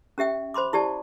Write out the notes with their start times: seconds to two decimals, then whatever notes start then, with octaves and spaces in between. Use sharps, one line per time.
0.18 C#4 G4 E5 G5
0.54 C5 B5 C6 D6
0.73 E4 G4 D5 A5